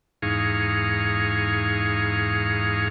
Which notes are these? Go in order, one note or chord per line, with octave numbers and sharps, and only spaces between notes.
E2 G#2 D#4 G#4 F5 C#6